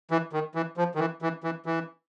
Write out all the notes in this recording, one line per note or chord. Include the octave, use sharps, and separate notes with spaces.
E3
D#3
E3
F3
D#3
E3
E3
E3
E3